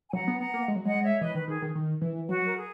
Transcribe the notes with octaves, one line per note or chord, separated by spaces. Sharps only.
G#5
F#3 F#5 A#5
B3
B3 F#5 A#5
A#3
G#3
F#3
G#3 D#5 F#5
C#5 E5
E3 B4 D#5
D#3 B4
D#3 G#4
D#3
D#3
E3
F#3 F#4
A#4
G#4